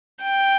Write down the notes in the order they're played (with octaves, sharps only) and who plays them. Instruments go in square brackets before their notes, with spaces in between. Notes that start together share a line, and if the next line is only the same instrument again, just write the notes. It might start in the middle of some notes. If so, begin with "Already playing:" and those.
[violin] G5